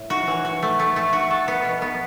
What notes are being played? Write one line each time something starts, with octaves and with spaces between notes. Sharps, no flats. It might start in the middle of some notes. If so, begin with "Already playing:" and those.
Already playing: A2
F#4
E3
F#4
A3
A3
A3
F#4
A4
B3
B2
B3